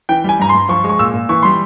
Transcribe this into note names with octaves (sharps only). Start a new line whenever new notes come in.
E3 G5
G3 G#5
G2 A#5
G2 C6
F3 C#6
G#3
C#6
A#2 E6
A#2
E3 C#6
G3 C6